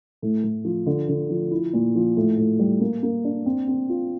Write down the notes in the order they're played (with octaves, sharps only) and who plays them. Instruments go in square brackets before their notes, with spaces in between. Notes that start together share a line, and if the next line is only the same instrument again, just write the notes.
[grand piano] A2
A2
F3
D3
D3
F3
E4
A#2
F3
A2
A2
G3
A#3
A#3
D4
C4
C4
F4